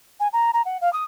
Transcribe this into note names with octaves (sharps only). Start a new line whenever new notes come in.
G#5
A#5
A#5
F#5
F5
D#6